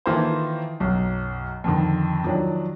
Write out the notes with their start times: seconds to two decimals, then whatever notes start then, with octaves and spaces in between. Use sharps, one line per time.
0.06 D#3 E3 A#3 F4 A4 C5
0.80 B1 F#2
1.64 F2 D3 D#3
2.24 D#3 F3 F#3 D4